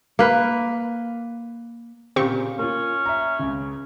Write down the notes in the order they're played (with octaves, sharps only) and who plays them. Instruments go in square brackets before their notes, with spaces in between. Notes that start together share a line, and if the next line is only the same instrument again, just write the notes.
[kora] A#3 B4
[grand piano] A#2 C#3 [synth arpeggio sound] C4 G4 C#6
[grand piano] A#3 F4 [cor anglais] C#4
[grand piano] E5 A#5
C#2 C#3